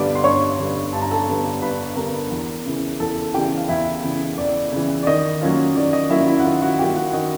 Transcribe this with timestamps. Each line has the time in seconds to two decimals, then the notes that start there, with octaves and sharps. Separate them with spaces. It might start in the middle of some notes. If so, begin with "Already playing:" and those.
Already playing: G2 D3 G3 B3 D5 D6
0.15 C6
0.24 G2 C#5 C#6
0.59 D3 G3 B3
0.93 G2 A5
1.02 A#5
1.11 A4 A5
1.28 D3 G3 B3
1.61 G2 B4 B5
1.96 D3 G3 B3 A#4 A#5
2.31 E2
2.65 C#3 E3
3.00 E2 A4 A5
3.34 C#3 E3 G4 G5
3.57 F5
3.69 E2 E4 E5
4.04 C#3 E3
4.38 E2 D5
4.72 C#3 E3
5.03 D5
5.07 D#3 D#5
5.42 F#3 A#3 C#4 F4
5.76 D#3 D5
5.93 D#5
6.10 F#3 A#3 C#4 E4 F4 E5
6.27 E4 E5
6.39 F#5
6.44 D#3 F4 F5
6.62 F#4 F#5
6.79 F#3 A#3 C#4 F4 G4 G5
6.96 F#4 F#5
7.13 D#3 D#5